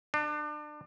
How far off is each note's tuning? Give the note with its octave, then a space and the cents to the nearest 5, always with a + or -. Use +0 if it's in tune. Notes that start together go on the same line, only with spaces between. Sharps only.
D4 +30